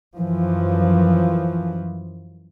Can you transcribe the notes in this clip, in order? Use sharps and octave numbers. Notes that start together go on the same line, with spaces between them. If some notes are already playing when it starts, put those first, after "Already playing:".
F#2 E3 F3